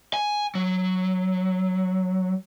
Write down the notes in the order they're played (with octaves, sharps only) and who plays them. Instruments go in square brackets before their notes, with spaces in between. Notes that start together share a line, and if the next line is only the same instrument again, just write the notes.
[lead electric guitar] G#5
F#3